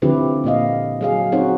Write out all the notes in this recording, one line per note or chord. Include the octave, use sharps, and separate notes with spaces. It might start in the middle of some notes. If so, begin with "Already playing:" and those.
D3 F3 C4 E4 G4 B4
A#2 A#3 D#5 F5
F#3 G#4 F5
C4 C#4 D#4 F#4 C5 C#5